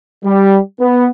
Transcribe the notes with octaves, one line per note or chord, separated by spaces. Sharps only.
G3
B3